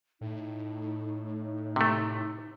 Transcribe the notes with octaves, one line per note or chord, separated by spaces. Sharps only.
A2 D#4
D#4
C3 A3